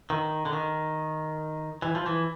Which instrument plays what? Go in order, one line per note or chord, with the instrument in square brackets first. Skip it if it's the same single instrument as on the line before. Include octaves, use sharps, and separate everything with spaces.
[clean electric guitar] D#3
D3
D#3
E3
F3
E3